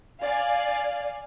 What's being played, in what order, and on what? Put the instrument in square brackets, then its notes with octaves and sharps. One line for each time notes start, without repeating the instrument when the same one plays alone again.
[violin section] D5 F5 G#5